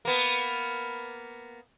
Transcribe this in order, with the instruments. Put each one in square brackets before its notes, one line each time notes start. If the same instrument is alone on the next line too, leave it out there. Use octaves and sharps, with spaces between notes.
[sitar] A#3 B3